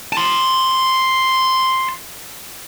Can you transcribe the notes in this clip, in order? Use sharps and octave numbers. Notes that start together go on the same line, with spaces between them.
A5 C6